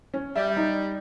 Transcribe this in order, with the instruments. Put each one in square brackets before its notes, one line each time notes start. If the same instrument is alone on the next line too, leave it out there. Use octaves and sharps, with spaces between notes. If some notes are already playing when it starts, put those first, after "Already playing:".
[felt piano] C#4
[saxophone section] G3 [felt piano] E5
[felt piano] D#4